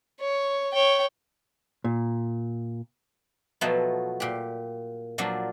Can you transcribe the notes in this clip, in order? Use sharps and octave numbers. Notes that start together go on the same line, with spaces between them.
C#5
C#5 G5
A#2
B2 F3 F#3 A3 B3
A#2 G4
A#2 F3 F#3 A#3 D4